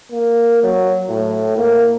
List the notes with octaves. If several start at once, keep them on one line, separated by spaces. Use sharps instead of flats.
A#3
F#3
A2
A#3